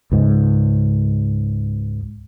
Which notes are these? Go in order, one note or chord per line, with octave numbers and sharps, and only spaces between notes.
C#2 G#2